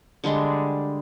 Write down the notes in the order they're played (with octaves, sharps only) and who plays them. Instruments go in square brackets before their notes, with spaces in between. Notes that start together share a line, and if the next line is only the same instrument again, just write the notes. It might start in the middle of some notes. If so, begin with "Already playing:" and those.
[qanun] D3 G3 G#3 D4